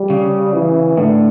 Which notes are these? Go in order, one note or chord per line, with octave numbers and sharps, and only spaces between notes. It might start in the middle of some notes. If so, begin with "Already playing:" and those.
Already playing: G3
C#3
E3
A2 D3